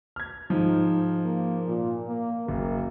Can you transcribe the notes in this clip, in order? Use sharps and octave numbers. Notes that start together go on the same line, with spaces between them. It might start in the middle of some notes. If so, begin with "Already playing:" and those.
F6 G#6
G#2 F3 D#4
A#3
A#2
A#3
F#1 A#3